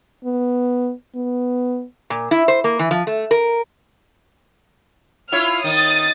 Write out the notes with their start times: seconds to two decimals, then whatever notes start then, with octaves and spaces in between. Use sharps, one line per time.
0.24 B3
1.15 B3
2.10 A#2
2.31 E4
2.48 C5
2.64 A#3
2.79 E3
2.91 F3
3.07 A3
3.31 A#4
5.32 E4 F4 C#5 F6
5.64 D#3 D#6 A6